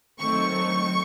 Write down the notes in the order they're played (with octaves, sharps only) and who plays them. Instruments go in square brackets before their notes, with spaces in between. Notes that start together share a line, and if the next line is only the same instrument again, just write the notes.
[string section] D#3 F#3 A3 C4 C#6